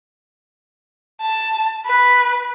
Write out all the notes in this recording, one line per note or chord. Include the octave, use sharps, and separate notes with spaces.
A5
B4